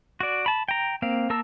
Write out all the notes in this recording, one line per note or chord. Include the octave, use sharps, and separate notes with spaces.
F#4 D5
A5 B5
G5 A#5
A#3 C4 F5
A#3 A#4 A5 E6